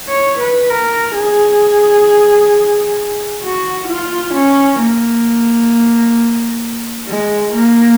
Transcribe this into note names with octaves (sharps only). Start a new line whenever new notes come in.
C#5
B4
A#4
G#4
F#4
F4
C#4
A#3
G#3
A#3